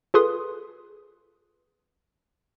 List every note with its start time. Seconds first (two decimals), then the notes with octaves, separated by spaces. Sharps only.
0.14 F4 G#4 A4 B4 C6 D#6